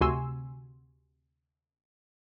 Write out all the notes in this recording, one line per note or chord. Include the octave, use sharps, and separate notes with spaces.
D2 C3 F#4 G#5 C6 E6